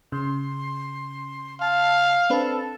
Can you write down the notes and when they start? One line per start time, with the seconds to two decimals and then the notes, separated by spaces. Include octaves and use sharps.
0.12 C#3 C6
1.61 F5 A5
2.30 C4 D4 A4 B4